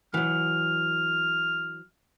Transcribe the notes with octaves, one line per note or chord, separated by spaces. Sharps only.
E3 F#3 F6